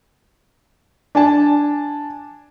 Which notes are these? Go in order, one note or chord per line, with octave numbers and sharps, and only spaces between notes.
D4 G#5 A5